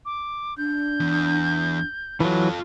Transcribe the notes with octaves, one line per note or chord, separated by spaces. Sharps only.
D6
D4 G6
E2
E3 F#3 F4 A4